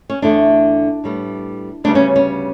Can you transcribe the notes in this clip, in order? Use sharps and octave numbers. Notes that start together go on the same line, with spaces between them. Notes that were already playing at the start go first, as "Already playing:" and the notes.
C#4
E2 D3 A3 D4
A2 G3 B3
D2 C#3 G3 B3 D4
C#4
C#4